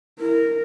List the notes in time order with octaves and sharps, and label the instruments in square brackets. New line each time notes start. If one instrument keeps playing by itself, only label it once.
[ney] E4 [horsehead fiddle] A#4